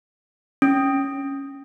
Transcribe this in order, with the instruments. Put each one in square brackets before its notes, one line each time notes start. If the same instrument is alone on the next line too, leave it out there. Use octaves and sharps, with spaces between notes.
[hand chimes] C#4